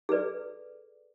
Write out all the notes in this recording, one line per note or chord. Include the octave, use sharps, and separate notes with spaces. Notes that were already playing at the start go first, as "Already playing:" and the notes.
G#4 A4 B4 D5